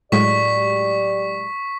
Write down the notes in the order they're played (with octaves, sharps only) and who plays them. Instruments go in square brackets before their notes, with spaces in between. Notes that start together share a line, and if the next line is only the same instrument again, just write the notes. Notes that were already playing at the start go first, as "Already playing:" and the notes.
[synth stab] A2 F#3 G#3 [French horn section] G4 D5 [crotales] C#6 B6